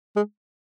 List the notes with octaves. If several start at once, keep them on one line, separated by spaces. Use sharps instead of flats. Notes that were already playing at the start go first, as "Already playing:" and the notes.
G#3